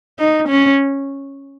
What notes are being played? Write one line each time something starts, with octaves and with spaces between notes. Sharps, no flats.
D#4
C#4